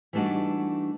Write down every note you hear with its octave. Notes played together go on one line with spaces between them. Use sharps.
E3 G3 A3 D4 D#4 F#4